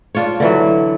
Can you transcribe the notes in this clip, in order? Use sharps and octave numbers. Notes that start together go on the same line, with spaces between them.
D4 F4 C5 C#5
D3 E3 F#3